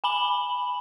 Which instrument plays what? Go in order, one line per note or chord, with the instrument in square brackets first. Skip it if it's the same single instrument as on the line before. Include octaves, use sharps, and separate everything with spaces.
[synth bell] G#5 B5 F#7